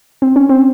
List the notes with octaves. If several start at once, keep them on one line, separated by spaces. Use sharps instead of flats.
C4
C#4
C4